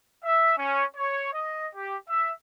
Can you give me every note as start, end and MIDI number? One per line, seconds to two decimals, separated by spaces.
0.24 0.53 76
0.57 0.84 61
0.96 1.29 73
1.34 1.68 75
1.75 1.96 67
2.09 2.32 76